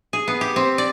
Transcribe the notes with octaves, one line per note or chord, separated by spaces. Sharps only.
G#4
B3
G4
C4
D5